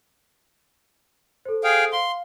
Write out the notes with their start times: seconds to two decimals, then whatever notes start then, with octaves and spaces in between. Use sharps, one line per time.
1.45 A4 C5
1.64 G#4 F5 G5
1.93 F5 C6